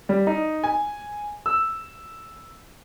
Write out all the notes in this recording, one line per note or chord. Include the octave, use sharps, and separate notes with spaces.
G3
D#4
G#5
E6